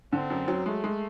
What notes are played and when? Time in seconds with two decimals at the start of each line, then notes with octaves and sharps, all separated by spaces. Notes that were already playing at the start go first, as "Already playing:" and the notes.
0.12 D3 C4
0.30 F#2
0.48 F#3
0.66 G#3 A3
0.84 G#3